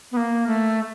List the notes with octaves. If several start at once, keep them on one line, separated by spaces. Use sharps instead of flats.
B3
A#3
A3